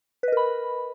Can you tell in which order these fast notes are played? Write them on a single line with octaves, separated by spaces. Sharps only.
B4 D#5 A#4 B5